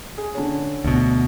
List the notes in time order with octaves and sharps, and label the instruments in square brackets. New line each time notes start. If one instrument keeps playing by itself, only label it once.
[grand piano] G#4
D3 C#4
[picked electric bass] D2 B2